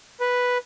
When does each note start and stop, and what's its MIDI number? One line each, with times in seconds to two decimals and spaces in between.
0.20 0.58 71